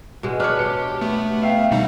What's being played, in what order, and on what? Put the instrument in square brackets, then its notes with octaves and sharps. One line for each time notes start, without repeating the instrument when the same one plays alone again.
[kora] B2 G#3
[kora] D4 C#5 [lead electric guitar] B4 [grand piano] D6 F6
[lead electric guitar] G4 [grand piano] C#7
[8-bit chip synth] A3 [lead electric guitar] B3
[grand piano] E5 F5 G5
[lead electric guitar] D#2 F#5 [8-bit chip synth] B2 G3 D#4